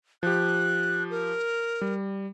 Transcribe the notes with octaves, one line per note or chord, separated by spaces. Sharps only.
F3 G4 F#6
A#4
G3